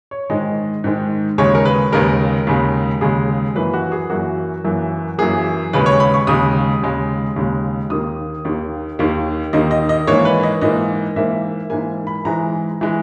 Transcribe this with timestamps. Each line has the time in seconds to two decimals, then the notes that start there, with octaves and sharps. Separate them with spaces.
0.11 C#5
0.30 G#2 D#3 G#3 D#5
0.84 G#2 D#3 G#3
1.38 D#2 C#3 G#3 C#5
1.55 A#4
1.65 B4
1.92 D#2 C#3 G#3 A#4
2.47 D#2 C#3 G#3
3.01 D#2 C#3 G#3 G#4
3.55 F#2 E3 A#3 B4
3.73 F#4
3.92 G#4
4.10 F#2 E3 A#3 F#4
4.64 F#2 E3 A#3
5.18 F#2 E3 A#3 G#4
5.73 D#2 C#3 G#3 B4
5.86 C#5
6.00 B5
6.14 C#6
6.27 D#2 C#3 G#3 D#6
6.82 D#2 C#3 G#3
7.36 D#2 C#3 G#3
7.90 D#2 D#3 A#3 D#6
8.45 D#2 D#3 A#3
8.99 D#2 D#3 A#3
9.53 D#2 D#3 A#3 D#5
9.71 D#5
9.89 D#5
10.07 G#2 E3 A#3 C#5
10.25 B4
10.43 D#5
10.61 G#2 E3 A#3 D#5
11.16 G#2 E3 A#3 E5
11.70 G#2 E3 A#3 G#5
12.07 B5
12.25 G#2 E3 G#3 A#5
12.81 E3 G#3